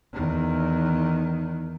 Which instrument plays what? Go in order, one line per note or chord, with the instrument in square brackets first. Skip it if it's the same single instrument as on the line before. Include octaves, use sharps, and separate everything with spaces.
[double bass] E2 D#3